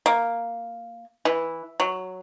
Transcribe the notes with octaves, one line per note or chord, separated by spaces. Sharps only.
A#3
E3
F#3